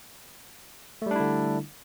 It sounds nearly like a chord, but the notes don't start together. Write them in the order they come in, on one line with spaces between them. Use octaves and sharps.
A3 G3 D4 E4 D3